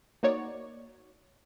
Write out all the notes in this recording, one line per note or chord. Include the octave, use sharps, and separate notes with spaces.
A#3 D#4 F#4 C#5 D5